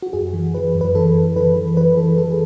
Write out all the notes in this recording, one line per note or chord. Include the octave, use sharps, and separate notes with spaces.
F#4
F#2 G#4
E3
E3 B4
F#2
B4
E3 A4
E3
E3 B4
E3
E3 B4
E3 A4
E3 A4
G#4